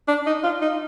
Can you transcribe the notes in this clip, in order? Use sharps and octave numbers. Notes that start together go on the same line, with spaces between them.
D4
D#4
F4
D#4